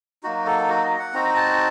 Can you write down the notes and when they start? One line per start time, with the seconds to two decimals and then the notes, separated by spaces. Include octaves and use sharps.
0.23 F#3 A#3 D#4 F#4
0.46 A4
0.69 F#4
0.84 D#5
0.99 F#5
1.13 C4 D#4 F#4 A#5
1.36 A5